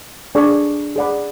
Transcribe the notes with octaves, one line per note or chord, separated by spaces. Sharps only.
D4 G#4 D5 G#5 C#6
G#4 D5 F#5 B5